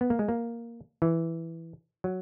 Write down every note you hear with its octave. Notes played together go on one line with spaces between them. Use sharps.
B3
A#3
G#3
A#3
E3
F#3